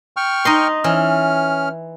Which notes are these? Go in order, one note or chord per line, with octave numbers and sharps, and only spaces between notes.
G5 C#6 F6
D#4 D#5 C6
E3 C#4 F6